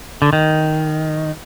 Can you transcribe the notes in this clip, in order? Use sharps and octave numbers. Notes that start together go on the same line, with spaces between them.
D3
D#3